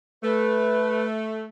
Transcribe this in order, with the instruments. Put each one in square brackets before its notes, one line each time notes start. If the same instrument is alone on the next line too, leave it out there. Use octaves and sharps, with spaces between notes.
[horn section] A3 [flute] B4